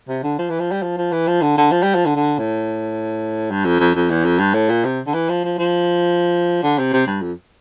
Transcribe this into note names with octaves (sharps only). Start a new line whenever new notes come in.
C3
D3
F3
E3
F3
G3
F3
F3
E3
F3
D3
D3
F3
G3
F3
D3
D3
A2
G2
F2
F2
F2
E2
F2
G2
A2
A#2
C3
D3
E3
F3
F3
F3
D3
C3
C3
G2
F2